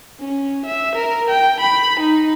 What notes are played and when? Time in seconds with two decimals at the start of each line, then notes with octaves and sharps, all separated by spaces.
0.20 C#4
0.65 E5
0.95 A#4
1.30 G5
1.60 B5
2.00 D#4